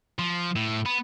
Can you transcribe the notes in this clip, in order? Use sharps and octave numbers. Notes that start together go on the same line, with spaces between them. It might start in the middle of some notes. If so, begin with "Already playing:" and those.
F3
A2
B3